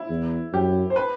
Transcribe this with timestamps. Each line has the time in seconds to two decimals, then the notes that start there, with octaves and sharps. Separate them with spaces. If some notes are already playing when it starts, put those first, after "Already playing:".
Already playing: E4
0.09 E2
0.53 F#2 G4
0.90 C5
0.96 B4